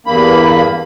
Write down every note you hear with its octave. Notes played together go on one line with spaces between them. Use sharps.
E2 G2 A#3 B5